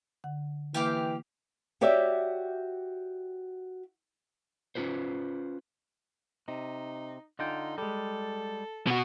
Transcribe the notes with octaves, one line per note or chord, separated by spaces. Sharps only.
D3 F#5
E3 A#3 G4 F5 D6
F#4 G4 C#5 D5 E5 G5
C#4 D#4 F4 B4 C5
C3 D#4
D3 D#4 F4 G5
G3 G#3 A4
B2 F#4